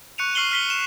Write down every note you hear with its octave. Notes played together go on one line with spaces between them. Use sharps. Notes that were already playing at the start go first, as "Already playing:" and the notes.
C#6 F#6 C#7 D#7 F7
C#6 F6 C7 F#7 G7
F6 B6 G7
E7